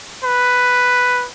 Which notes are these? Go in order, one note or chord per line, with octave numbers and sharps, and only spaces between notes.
B4